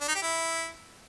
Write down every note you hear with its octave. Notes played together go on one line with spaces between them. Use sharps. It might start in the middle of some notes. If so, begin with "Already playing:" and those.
D4
D#4
G4
E4